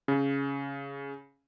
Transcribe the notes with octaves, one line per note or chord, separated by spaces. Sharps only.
C#3